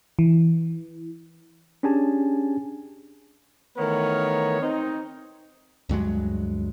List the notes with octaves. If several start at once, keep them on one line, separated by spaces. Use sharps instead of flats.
E3
C#4 D4 G4 G#4 G#5 A5
D#3 E3 A3 B3 A#4 C#5
C4 D#4
D2 G2 F#3 G#3